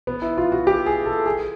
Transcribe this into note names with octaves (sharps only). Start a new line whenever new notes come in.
B3
E4
F4
F#4
G4
G#4
A4
G#4